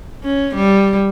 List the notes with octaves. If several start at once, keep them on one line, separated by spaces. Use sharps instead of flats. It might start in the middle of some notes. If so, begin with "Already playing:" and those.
C#4
G3